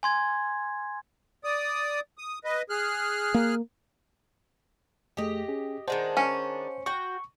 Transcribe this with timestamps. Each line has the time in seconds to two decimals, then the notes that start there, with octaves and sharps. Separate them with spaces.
0.03 G#5 C6 G#6
1.44 D5 D#6
2.18 D#6
2.44 B4 D#5
2.70 G#4 F6 F#6
3.34 A#3
5.17 F2 A3 G4 G#4 D#5
5.49 C#4 G#4
5.88 D#3 G#3 D4 C5 D#5 F#5 A5
6.17 C#4
6.86 F#4 G5 C#6